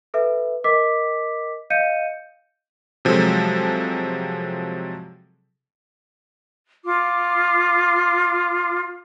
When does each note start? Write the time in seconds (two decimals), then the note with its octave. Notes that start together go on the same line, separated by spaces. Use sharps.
0.14 A4 B4 E5
0.64 A#4 D#5 D6 B6
1.70 D#5 F5 G6 C#7 D#7
3.05 C3 F3 F#3 G#3 A4
6.85 F4 D6